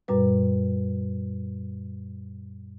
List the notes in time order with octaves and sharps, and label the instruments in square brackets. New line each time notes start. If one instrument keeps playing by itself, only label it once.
[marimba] F#2 A#2 G3 B4